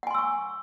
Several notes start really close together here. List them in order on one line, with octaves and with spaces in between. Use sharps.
F#5 G#5 C6 E6 C#6